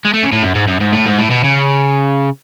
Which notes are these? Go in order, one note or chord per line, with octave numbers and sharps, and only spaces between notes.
G#3
A3
C#3
A2
F#2
G#2
F#2
G#2
A2
G#2
A2
B2
C#3